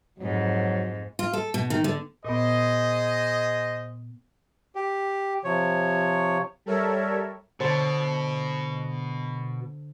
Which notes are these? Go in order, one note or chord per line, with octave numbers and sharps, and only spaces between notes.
F2 G#2 F#3
F4
A4
B2
D#3
D3
A#2 B3 G#4 C5 D#5
G4
C3 F3 C#5
G3 A4 A#4 C#5 E5
B2 D3 C5 A5